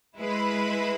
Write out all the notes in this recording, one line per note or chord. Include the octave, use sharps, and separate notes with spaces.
G#3 E4 B4